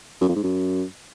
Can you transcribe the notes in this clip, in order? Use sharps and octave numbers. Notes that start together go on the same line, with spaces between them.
F#2
F2
G#2
F#2